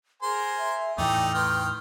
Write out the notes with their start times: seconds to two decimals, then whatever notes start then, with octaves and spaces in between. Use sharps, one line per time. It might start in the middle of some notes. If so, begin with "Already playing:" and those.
0.23 G#4 A#4 C5 G#5 C6
0.58 E5
0.98 E2 A2 E3 A3 D#4 D5 G5
1.34 D#3 B4 G5 C6 F6